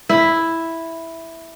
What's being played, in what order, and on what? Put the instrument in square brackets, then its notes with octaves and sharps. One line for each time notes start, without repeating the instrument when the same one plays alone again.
[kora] E4